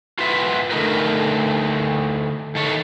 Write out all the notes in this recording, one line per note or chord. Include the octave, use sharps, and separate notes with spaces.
F4 F#4 B4 E5
D3 A3 B3 D#4 A#4 B4
D#3 A4 C#5